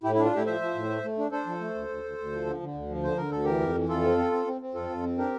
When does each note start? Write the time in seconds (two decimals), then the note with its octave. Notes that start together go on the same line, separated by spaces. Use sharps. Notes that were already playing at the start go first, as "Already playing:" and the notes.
0.03 A2 E4 G4
0.14 E4
0.18 D4
0.25 F4
0.32 A2 E4 G4
0.46 F3 C5 E5
0.61 F3
0.75 A2
0.89 A3
1.03 A3
1.18 D4
1.31 D4 A4 C5
1.46 F3
1.60 A3
1.75 D2
1.89 D2
2.04 D2
2.18 D2
2.32 F3
2.46 D3
2.60 D3
2.74 D2
2.89 F3
3.03 D3 C5
3.17 D3 A#4
3.31 D2 A4
3.44 E3 G4 A#4
3.60 F2
3.75 E3
3.89 F2 F4 A4
4.03 C4
4.18 C4
4.32 C4
4.46 C4
4.61 C4
4.74 F2 F4 A4
4.90 F2
5.03 C4
5.18 D4 G4 A#4